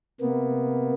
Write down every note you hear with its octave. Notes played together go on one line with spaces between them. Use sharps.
C3 A#3 B3